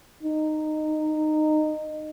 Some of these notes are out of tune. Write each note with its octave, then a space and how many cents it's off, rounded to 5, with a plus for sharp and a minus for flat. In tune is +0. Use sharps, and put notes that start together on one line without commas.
D#4 -15